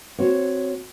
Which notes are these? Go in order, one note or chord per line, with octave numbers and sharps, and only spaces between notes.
C4 F#4 C#5